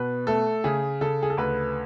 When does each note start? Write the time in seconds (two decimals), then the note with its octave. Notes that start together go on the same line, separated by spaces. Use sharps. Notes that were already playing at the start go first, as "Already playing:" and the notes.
Already playing: B2 B4
0.27 A3 A4
0.64 C#3 G#4
1.01 C#3 A4
1.23 G#4
1.30 A4
1.37 D2 B4